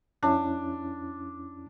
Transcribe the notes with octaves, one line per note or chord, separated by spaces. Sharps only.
F2 C#4 D4 E4